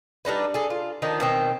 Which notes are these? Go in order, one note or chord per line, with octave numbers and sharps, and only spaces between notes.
G3 D4 D#4 B4
G#4 A4
F4
D#3 F3 D4 D#4
B2 D#3 C4